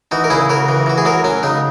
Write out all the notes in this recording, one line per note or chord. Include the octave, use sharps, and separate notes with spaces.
E3 D#4 F#4
A#4
C#3 E4 G#4
C#3 F#4 A#4
E3
E3 F#4
G#4
F#3 F#4 A#4
F#3 C#4
C#3 D#4